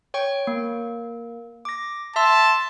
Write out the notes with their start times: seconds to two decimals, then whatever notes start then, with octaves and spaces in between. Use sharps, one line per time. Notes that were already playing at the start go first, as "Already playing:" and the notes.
0.14 C#5 G5 C#6
0.47 A#3
1.65 D6 A#6
2.16 E5 A5 C6 E6